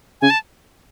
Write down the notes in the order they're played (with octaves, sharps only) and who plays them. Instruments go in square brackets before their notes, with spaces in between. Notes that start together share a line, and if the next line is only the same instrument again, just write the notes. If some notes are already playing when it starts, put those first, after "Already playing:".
[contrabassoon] C#3 [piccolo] G#5
[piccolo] A5